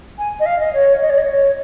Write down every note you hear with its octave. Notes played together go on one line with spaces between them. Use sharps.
G#5
D#5
F5
D#5
C#5
D#5
C#5
D#5
C#5